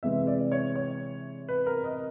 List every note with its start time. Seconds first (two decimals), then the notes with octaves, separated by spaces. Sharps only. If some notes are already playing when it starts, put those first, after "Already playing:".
0.03 C3 E3 G#3 C4 E5
0.27 D5
0.52 C#5
0.76 C#5
1.48 B4
1.66 A#4
1.84 D#5